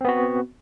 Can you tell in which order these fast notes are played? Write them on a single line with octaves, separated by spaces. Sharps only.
C4 B3 F#4